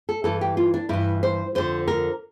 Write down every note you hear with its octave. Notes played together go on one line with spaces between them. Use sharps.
A4
G2 E3 A4
G4
F4
D4
G2 E3 E4
C5
F2 D3 C5
A#4